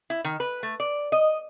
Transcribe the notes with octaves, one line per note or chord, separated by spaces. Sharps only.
E4
D#3
B4
A3
D5
D#5